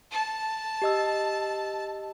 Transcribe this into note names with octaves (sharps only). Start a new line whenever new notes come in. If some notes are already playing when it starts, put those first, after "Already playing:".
A5
G4 D#5 E6